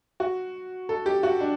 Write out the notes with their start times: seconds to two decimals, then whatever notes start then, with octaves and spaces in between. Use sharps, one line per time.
0.20 F#4
0.89 A4
1.06 G4
1.23 F#4
1.41 D4